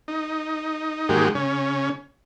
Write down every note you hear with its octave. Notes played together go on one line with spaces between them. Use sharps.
D#4
G#2 D#3 G#3 A#3 F#4 G4
C#3 C#4